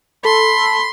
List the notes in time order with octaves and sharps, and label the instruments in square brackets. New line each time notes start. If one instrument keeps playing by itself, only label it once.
[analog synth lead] A4 [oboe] B5 [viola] C6